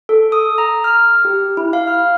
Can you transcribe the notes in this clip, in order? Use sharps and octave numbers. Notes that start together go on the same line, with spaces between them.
A4
D#6
A#5
F6
G4
E4
F5
F6